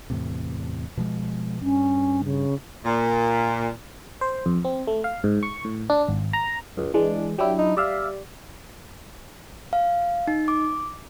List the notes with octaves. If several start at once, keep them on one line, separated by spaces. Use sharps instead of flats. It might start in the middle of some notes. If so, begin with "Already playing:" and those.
E2 A2 C3
B2 F3 G#3
G2 C#4
C#3
A#2
C5
F2
C4
A3
F5
G#2
C#6
A2
D4
G#1
A#5
C#2 F#2
E3 G#3 D4
F#3 D4 E4 G4
D#4
G3 D5 E5 F5
F5
D#4
D6